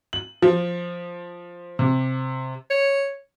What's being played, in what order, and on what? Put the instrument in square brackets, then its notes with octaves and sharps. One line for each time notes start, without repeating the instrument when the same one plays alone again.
[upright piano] F#7
F3
C3
[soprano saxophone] C#5